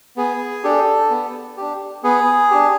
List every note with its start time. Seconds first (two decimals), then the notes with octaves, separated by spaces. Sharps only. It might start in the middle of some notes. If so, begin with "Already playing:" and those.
0.17 B3 G#4
0.64 D4 G4 A4
1.10 B3
1.57 D4 G4
2.03 B3 G#4
2.51 D4 G4